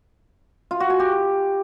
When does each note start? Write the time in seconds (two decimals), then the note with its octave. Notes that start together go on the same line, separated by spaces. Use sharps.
0.71 F4
0.80 F#4
0.90 G#5
1.00 G4